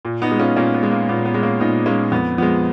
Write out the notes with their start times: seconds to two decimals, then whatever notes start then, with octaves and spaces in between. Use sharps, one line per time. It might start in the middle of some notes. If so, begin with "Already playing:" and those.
0.05 A#2
0.22 B3 D#4
0.31 G#3
0.39 C#4 F4
0.57 A#2 A#3 C#4
0.74 B3
0.83 G#3
0.91 A#3
1.09 A#2 B3
1.25 B3
1.34 G#3
1.43 A#3 C#4
1.60 A#2 B3 D#4
1.86 G#3 A#3 C#4
2.12 F2 B3
2.38 F3 G#3 B3